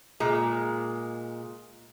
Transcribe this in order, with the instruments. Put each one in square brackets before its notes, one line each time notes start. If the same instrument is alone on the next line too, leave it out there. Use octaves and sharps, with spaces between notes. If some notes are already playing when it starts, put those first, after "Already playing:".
[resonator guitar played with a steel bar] A#2 G#3